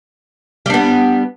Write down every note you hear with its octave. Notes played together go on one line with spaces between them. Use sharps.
G3 B3 D4